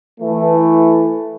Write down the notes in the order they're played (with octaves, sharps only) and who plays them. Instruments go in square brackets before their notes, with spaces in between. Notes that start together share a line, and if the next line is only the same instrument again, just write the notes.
[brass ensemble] E3 A3